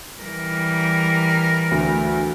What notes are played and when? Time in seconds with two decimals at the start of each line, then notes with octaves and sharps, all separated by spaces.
0.21 E3 G3 A#4
1.71 D2